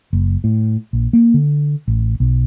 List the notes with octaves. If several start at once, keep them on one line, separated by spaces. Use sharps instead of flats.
F#1
A2
A#1
A#3
D3
A1
B1